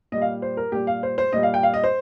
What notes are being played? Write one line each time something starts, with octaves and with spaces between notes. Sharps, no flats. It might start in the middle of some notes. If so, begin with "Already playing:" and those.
A#2 G3 D#5
F5
C5
A#4
A#2 G3 G4
F5
C5
C5
A#2 G3 D#5
F5
G5
F5
D#5
C5